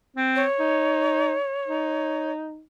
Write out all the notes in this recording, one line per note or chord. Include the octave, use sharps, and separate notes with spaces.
C4
C#5
D#4
D#4